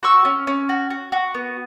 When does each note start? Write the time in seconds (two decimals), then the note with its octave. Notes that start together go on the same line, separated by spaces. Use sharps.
0.03 F#4 C#6 E6
0.25 C#4
0.47 C#4
0.69 F#4
0.90 F#4
1.12 F#4
1.34 B3